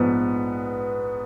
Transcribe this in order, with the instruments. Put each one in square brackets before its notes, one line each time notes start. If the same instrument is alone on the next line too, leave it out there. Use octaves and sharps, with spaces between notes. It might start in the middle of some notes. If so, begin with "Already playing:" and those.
Already playing: [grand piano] A#1 G#2 F3 [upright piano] B3